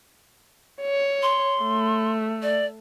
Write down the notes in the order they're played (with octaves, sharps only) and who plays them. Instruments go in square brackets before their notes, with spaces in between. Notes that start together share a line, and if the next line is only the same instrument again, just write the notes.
[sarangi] C#5
[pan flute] C6
[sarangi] A3
[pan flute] D5